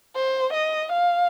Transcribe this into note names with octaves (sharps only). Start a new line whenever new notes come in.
C5
D#5
F5